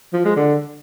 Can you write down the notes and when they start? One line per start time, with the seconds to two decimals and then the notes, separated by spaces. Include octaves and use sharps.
0.13 F3
0.25 G#3
0.36 D3